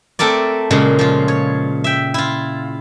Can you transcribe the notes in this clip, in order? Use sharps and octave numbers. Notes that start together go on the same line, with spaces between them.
A3 C4 A4 A#4 D5
A#2 C#3 G#3
F3 F4
C#5
E5 G5
E4 F4